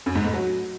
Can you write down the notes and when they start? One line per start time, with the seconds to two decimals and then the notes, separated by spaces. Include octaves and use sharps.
0.06 F#2
0.15 G#2
0.25 A2
0.34 F#3